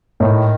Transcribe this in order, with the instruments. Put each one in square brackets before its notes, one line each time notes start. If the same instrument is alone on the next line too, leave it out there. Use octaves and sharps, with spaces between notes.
[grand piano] A2 [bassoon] D#3